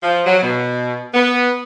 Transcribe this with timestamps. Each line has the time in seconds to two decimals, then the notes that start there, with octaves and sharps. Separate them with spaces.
0.03 F3
0.26 F#3
0.43 B2
1.14 B3